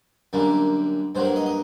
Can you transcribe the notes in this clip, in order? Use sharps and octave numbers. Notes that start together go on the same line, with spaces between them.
F#2 D3 G3 A#3
G2 F#3 A#3 C5
F#5
D#5
D#5